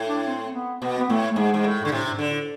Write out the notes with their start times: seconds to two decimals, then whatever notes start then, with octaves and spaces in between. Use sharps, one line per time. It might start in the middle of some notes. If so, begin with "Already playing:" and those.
Already playing: A2
0.08 D4
0.26 C4
0.54 B3
0.81 B2 B3
0.98 B3
1.10 A2 A3
1.32 A3
1.36 G#2 G#3
1.54 G#2
1.64 A2
1.82 G#2 D3
1.91 A2 C3
2.10 G#2
2.19 D3
2.28 A2